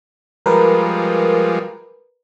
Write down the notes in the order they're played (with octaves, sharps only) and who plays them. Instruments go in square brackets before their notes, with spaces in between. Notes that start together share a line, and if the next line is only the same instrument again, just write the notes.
[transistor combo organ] F3 G3 G#3 [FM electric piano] A#4 B4